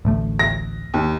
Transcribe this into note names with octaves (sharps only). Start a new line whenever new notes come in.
A1 D2 A3
A#6
D#2